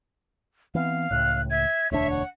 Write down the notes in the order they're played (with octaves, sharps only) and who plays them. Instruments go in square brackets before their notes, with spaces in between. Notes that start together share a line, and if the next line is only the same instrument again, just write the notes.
[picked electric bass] E3 B3 C4 [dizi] F5
[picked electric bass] C#2 A2 [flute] F#6
[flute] E5 [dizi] G#6
[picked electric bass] E1 D2 D4 [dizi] C#5 [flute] E5
[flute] F#5